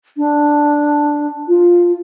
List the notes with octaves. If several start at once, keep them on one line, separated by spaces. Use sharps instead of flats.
D4
F4